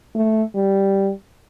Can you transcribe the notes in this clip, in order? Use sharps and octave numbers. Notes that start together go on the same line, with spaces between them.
A3
G3